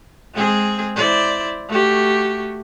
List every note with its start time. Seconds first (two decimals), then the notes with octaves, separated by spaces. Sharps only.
0.33 G#3 C4 G#4
0.96 E4 C5 D5
1.68 A3 F#4 G4